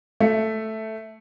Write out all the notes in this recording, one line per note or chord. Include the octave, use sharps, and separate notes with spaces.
A3